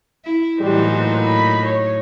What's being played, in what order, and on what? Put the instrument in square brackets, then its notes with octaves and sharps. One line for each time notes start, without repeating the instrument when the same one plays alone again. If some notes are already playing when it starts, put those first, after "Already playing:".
[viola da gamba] E4
[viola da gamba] A2 F#3 D#4 [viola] E3 C5 [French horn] G3
[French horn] A#2
[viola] B5
C#5